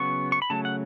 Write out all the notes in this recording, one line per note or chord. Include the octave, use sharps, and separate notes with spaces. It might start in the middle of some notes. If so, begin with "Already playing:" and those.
Already playing: C#3 F#3 B3 C#6
C#6
B5
C#3 F#3 A3 A5
F#5